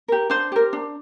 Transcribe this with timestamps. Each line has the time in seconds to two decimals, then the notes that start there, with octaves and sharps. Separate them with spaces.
0.08 G4 A#4
0.30 D4 C5
0.52 G4 A#4
0.73 D4